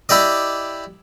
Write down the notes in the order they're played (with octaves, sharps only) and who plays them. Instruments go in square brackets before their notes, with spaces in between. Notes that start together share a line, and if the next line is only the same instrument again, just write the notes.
[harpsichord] E4 G4 D5 D#5